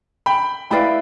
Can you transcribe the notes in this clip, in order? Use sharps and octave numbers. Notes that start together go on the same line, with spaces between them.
G5 B5
E4 B4 D5 F5 G5 B5